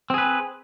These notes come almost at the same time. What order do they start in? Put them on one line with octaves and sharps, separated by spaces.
C4 G#4 B4